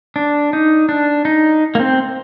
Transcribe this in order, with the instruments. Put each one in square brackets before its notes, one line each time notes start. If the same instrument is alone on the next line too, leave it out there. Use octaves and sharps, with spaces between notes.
[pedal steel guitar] D4
D#4
D4
D#4
A#3
C4